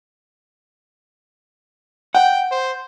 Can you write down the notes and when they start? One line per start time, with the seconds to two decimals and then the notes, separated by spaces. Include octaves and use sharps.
2.15 F#5 G5
2.51 C5